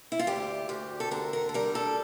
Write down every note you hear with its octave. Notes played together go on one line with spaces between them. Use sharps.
E4
F4
D2 G4
D2 G4
A4
D3 A#4
A#4
A4
G3 A#4
A4